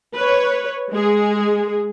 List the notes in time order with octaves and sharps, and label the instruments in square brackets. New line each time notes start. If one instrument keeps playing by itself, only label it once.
[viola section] B4 C#5
G#3 G#4